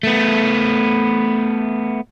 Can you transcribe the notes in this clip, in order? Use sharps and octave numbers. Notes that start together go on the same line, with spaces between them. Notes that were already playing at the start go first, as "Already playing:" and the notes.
A3 B3